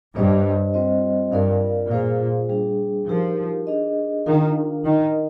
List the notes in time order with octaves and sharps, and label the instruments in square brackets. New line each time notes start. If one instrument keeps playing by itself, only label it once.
[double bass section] G2 [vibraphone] G3 D4 G4 C5 D#5
[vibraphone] G3 C4 F4 C5 D#5
[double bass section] G2 [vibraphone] F4 A#4 D5 F5
[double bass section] A#2 [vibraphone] F4 G#4 C5 F5
[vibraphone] G3 D4 G#4
[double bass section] F3 [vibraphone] D#4 G4 A#4 F5
[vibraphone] D4 G#4 D#5
[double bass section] D#3 [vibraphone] D4 F4 A#4 F5
[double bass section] D#3 [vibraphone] D#4 A#4 D#5